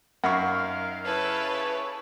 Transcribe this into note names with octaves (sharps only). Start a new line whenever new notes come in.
F#2 D#3 A#4 F5 F#5 B5 C#6
C#3 E4 A4 B4 C#5